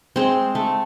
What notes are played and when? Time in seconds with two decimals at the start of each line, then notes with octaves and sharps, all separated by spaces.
0.16 G#3 C4
0.55 A3